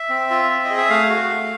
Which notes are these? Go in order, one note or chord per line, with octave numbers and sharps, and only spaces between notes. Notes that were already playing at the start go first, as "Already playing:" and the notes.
Already playing: E5
C4
F4
C4
D#5
G#4
E5
A3 F5
F#4
A3